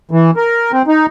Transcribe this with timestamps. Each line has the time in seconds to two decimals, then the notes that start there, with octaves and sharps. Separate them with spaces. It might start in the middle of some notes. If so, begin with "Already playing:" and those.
0.11 E3
0.37 A#4
0.72 C4
0.87 D#4